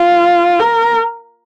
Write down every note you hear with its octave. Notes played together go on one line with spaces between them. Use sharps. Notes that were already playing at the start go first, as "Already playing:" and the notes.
Already playing: F4
A#4